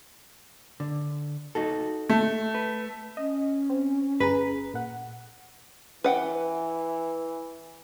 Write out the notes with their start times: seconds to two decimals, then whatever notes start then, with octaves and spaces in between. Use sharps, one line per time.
0.80 D3
1.55 D#4 F#4 A4
2.10 A3
2.55 B4
3.17 C#4 D#5
3.70 C4
4.20 G1 G#4 B4 A#5
4.74 A#2 F#5
6.04 E3 B4 F#5 G5